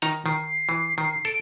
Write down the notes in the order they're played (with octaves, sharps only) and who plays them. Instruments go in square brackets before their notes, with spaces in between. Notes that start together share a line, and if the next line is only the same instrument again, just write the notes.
[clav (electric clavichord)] D#3 D#4 A#5
[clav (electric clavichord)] D#3 [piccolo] C7
[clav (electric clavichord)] E3
D#3
[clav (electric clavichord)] A4 [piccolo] D7